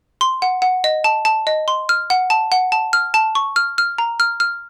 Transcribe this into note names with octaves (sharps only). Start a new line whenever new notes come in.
C6
F#5
F#5
D#5
A5
A5
D#5
C6
F6
F#5
A5
F#5
A5
F6
A5
C#6
F6
F6
A#5
F6
F6